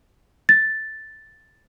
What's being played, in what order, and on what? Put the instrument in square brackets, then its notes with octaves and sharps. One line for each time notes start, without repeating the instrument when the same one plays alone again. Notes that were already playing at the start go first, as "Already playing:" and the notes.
[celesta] A6